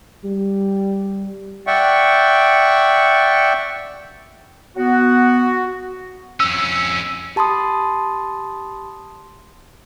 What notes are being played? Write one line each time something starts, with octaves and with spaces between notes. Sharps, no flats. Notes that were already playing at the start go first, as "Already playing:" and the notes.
G3
D5 E5 F#5 G5 C#6
B3 F#4
F2 C#4 E6
G4 A5 B5 C6 D#6